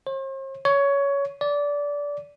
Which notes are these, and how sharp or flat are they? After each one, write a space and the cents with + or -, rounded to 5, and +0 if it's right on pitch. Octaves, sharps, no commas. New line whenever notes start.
C5 +45
C#5 +15
D5 -20